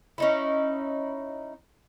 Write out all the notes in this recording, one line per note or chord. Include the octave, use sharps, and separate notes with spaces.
C#4 D#4 E4